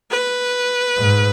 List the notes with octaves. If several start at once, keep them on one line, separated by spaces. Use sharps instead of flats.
B4
G#2